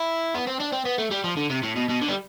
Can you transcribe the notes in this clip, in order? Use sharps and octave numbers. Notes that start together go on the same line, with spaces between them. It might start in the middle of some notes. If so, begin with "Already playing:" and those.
Already playing: E4
B3
C4
D4
C4
B3
A3
G3
F3
D3
C3
A2
B2
B2
D3
G3